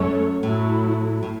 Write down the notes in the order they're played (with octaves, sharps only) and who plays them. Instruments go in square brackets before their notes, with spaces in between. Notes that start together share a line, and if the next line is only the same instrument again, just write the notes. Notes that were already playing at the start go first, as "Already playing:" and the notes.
Already playing: [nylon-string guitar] F#2 [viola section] A3 A4 C#5
[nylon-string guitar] A2 [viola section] F#3 A3 E4
[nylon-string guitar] A2